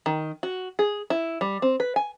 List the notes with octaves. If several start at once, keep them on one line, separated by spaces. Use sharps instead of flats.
D#3
F#4
G#4
E4
G3
C4
B4
G#5